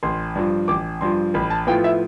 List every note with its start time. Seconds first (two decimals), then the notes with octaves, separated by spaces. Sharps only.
0.03 A1 C6
0.35 G2 F3
0.68 A1 D6
1.01 G2 F3 C6
1.34 A1 B5
1.50 A5
1.67 A2 F3 B3 F4 G5
1.84 E5